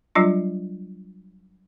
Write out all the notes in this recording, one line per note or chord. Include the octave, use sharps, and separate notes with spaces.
F#3 G3 D4 F4